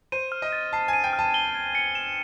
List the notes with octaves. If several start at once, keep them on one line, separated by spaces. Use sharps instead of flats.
C5 D#7
F6
D#5
A6
A5 C7
G#5
D#7
G5
F6
A5
G7
G#6
C#7
E7